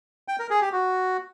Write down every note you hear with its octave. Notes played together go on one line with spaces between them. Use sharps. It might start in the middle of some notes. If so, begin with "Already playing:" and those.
G5
A#4
G#4
G4
F#4